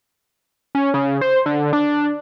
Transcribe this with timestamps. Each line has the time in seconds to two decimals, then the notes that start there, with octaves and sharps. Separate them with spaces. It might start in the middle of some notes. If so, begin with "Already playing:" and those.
0.75 C#4
0.94 C#3
1.21 C5
1.46 D3
1.73 D4